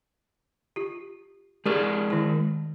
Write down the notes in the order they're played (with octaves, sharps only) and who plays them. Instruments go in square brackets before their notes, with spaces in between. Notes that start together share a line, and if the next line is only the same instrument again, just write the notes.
[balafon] F4 G4
[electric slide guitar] G#3 A#4 D5 [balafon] G4 G#4 C#6
[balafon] D#3 E4